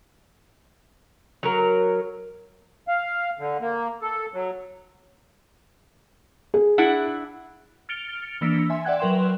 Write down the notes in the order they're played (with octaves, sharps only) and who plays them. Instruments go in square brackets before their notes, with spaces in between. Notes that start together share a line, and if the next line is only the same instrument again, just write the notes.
[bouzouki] F#3 A#4
[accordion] F5
D3
A#3
A4
F#3
[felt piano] G#4
[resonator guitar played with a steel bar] D4 E4 F#5
[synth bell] F6 A6 C#7 D7 F7 G7
E3 A#3 D4 E6 B6 C#7
E5 G#5 C6
D5 E5 F#5 G5 F#6 G#6
F#3 A#4 B4 G5 C6 E7